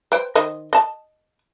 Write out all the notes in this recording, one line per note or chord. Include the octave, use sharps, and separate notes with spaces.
B4 C5 G5
D#3 C5 D#5
D#5 A5